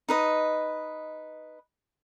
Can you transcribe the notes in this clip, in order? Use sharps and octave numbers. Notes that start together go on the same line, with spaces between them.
D#4 B4 D#5